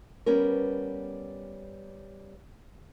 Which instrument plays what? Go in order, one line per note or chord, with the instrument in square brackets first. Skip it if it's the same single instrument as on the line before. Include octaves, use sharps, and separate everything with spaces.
[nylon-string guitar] G3 B3 C#4 A#4